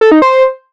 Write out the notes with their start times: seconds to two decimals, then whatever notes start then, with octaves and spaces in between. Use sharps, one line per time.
0.01 A4
0.12 D#4
0.22 C5